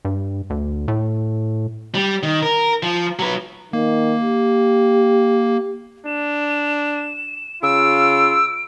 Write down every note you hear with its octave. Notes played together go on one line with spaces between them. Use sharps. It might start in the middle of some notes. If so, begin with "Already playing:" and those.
G2
D2
A2
G3
D#3
A#4
F3
F#3 B4
D#3 A#3
G4
D4 E7
C#3 F4 E6 D7